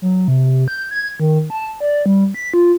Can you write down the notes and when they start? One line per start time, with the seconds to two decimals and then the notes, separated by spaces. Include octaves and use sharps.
0.02 F#3
0.28 C3
0.68 G6
0.91 G#6
1.20 D#3
1.50 A5
1.80 D5
2.06 G3
2.34 B6
2.54 F4